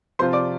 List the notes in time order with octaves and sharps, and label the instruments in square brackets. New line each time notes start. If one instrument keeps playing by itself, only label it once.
[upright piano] C3 F3 C4 F4 [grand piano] C5 C6
[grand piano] D5 D6